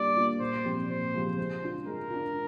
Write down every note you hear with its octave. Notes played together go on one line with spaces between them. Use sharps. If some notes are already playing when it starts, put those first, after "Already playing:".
Already playing: G3 A#3 D4 F4 D5
A#3 D4 F4
A#2 C5
F3 G#3 C4 G4
A#2 C5
F3 G#3 C4 G4
G#3 C5
D4 F4
G#3 A#4
D4 F4